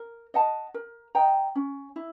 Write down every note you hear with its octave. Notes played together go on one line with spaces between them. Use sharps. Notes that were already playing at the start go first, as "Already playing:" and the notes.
Already playing: A#4
D#5 F#5 A5
A#4
D#5 G5 A#5
C#4
E4